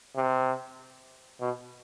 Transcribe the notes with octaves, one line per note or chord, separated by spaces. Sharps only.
C3
B2